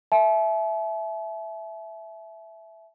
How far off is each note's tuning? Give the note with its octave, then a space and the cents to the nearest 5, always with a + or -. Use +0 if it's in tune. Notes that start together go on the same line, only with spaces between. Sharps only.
E5 +0 A5 -45